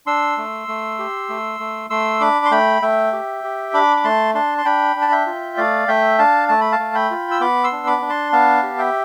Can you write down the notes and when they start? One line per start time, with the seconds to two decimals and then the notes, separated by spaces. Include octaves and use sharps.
0.06 D4 C6 E6
0.38 A3
0.68 A3
0.99 G4
1.29 A3
1.60 A3
1.90 A3 C6 E6
2.20 D4 B5 D6
2.45 C6
2.51 A3 G5 B5
2.82 A3 E5 G5
3.13 G4
3.44 G4
3.74 D4 B5 D6
3.97 D6
4.04 A3 A5 C6
4.34 D4 A5 C6
4.58 C6
4.65 D4 G5 B5
4.96 D4
5.02 A5
5.12 E5 G5
5.26 F4
5.57 A3 D5 F5
5.88 A3 E5 G5
6.18 D4 F5 A5
6.49 A3 A5
6.61 B5
6.72 F5 A5
6.79 A3
6.95 G5 B5
7.10 F4
7.31 E6
7.41 B3 B5 D6
7.64 C6 E6
7.72 D4
7.87 B5 D6
8.02 D4
8.09 A5 C6
8.32 B3 F5 A5
8.63 G4
8.78 E5 G5